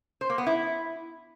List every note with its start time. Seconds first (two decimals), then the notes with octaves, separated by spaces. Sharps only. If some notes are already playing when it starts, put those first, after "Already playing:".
0.21 C5
0.30 A#3
0.38 B3
0.47 E4